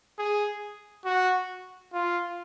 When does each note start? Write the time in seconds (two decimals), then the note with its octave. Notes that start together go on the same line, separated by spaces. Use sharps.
0.19 G#4
1.05 F#4
1.93 F4